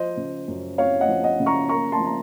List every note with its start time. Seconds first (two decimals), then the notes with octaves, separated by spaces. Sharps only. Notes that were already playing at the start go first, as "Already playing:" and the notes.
Already playing: F3 C5 D#5
0.17 C#3
0.48 F#2
0.78 C4 C#5 F5
1.01 D#5 F#5
1.08 F3
1.24 D#5 F#5
1.40 C#3
1.46 A#5 C#6
1.69 A#3 A#5 C#6
1.92 A5 C6
2.00 F3
2.05 A#5